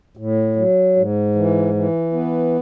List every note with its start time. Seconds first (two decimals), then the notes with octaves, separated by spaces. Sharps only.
0.17 A2
0.56 F#3
0.96 G#2
1.35 E3
1.74 E3
2.13 B3